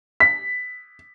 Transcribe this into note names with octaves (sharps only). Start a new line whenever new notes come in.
B6